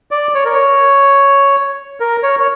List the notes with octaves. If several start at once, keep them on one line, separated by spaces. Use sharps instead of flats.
D5
C#5
A#4
C#5
A#4
C#5
C#5